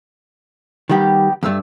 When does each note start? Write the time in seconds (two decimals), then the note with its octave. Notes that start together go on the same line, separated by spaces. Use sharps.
0.90 D#3 G3 A#3 B3 G4
1.43 E2 G2 A3 E6 F6